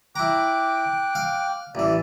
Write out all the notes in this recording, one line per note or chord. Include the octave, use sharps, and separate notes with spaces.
E4 G5 A#5 D6 F#6
F5
A1 E3 D5